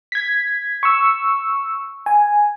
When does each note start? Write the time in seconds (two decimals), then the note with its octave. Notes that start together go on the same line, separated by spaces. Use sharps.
0.12 G#6 B6
0.83 C#6 E6
2.06 G#5